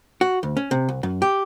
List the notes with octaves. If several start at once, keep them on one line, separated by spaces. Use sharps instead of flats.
F#4
D2
C#4
C3
C2
F#2
G4